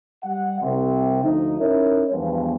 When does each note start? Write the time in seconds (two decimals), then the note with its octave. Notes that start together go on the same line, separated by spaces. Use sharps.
0.24 G3 F#5
0.61 C2 C3
1.23 D2 F3 D#4
1.60 C#4 D#4 E4 A#4 C#5
2.11 E2 G2 F3 G#3 B3